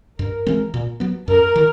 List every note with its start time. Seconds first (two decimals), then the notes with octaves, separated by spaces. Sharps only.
0.18 G2 A#4
0.46 E3 G#3 C4
0.74 A#2
1.00 F#3 B3
1.28 F#2 A#4
1.56 D#3